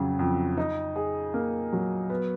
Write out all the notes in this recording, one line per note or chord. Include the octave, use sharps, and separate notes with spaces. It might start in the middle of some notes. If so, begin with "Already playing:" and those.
Already playing: F2 C#3 F#3
F2
D#4
G#4
A#3
F#3
B3